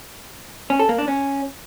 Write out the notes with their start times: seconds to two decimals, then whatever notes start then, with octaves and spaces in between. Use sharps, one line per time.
0.70 C#4
0.79 A4
0.89 A#3
0.98 D4
1.08 C#4